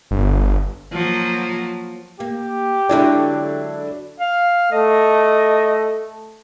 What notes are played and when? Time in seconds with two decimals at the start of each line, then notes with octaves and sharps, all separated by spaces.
0.11 G1
0.92 F3 F#3 A#3
2.20 A#3 G4
2.89 D3 F#3 G#3 D4 E4
4.20 F5
4.72 A3 D#5